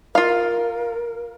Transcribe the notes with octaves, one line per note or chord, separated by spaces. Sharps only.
F4 A#4 F5